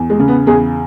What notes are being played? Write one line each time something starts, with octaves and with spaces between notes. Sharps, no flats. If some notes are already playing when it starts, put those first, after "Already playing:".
Already playing: E2
G#3
C#3
B3
E2 G#4